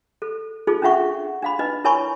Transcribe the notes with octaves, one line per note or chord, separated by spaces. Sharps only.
A4
D#4 F4 G#4 A4
C#4 D4 F4 E5 F#5 C#6
D4 F5 B5
D4 D#4 B4 D#5
E4 A#4 C#5 G#5 B5 C#6